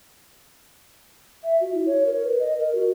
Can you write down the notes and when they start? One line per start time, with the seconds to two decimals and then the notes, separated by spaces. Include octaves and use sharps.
1.43 E5
1.61 F#4
1.74 E4
1.86 C#5
2.07 A#4
2.23 B4
2.39 D#5
2.59 A#4
2.75 F#4